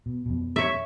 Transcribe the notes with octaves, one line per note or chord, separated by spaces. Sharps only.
B2
F2 B2
C#5 E5